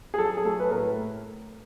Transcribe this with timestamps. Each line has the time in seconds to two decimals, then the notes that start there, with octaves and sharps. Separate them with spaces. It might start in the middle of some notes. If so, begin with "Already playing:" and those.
0.14 G#4
0.18 F#3 A4
0.37 G#4
0.45 A3 A4
0.60 B4
0.71 A2 A#4